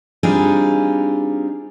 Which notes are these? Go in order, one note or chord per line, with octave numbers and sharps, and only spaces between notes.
G3 C4 D4 D#4 F4 G#4